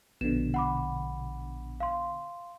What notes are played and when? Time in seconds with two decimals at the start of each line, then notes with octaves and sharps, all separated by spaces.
0.21 A#1 B2 D3 E7
0.54 F#5 B5 D6
1.80 F5 C6